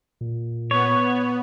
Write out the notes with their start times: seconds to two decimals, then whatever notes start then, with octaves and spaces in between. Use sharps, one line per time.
0.21 A#2
0.71 B3 C#5